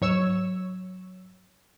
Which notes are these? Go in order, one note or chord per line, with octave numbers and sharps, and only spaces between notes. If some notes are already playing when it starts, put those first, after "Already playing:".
G#2 F#3 C#5 E6